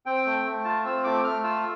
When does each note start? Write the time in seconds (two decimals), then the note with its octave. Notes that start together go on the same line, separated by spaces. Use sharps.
0.06 C4 G5
0.26 A3
0.45 A3
0.65 F4 A5
0.85 C4 E6
1.04 A3 D6
1.24 A3 F6
1.43 F4 E6